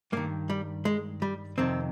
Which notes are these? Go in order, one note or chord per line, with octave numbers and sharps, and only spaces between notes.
G2 D#3 A#3
G3
G#3
G3
F2 C3 D#3 C4